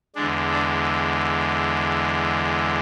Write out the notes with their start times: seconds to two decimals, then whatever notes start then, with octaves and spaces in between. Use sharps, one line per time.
0.15 E2 D3 G#3 D4
0.51 D4